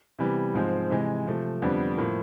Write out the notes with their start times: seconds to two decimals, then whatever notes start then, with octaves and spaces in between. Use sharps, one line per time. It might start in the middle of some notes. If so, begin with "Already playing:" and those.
0.19 C3 E3 G3 B3
0.54 G#2 F3 G#3 C4
0.90 C3 E3 G#3
1.26 C3 F3 A3
1.62 F2 D3 G3 B3 D4
1.98 A2 F3 A#3